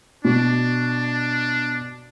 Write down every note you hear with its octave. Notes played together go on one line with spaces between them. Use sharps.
B2 D4